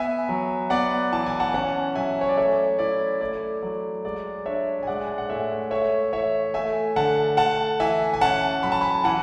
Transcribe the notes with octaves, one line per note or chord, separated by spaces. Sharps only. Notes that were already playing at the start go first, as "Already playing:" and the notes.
Already playing: B3 E5 G#5
F#3
B3 D5 F#5
E3 A5
G#5
F#5 A5
C#4 F#5 A5
F#3 E5 G#5
C#5
D5
A3 C#5 E5
E4 D5
A3 D5
F#3 D5
G#3 D5
D4 C#5 E5
G#5
G#3 D5 F#5
G#5
F#5
A2 C#5 E5
A3 C#5 E5
E3 C#5 E5
A3 E5 G#5
D3 F#5 A5
A3 F#5 A5
E3 E5 G#5
G#5
C#4 F#5 A5
F#3 B5
A5
G#5 B5
E3 F#5 A5